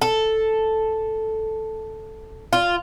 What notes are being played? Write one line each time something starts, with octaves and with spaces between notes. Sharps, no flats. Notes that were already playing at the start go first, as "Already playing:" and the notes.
A4
F4